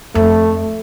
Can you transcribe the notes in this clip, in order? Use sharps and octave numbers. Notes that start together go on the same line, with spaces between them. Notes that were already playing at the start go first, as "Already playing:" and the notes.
F2 A3